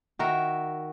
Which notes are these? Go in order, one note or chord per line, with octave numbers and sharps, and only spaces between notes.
D#3 F#4 A#4 E5